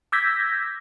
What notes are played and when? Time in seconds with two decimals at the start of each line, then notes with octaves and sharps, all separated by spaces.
0.12 D6 E6 G6 G#6 A#6 B6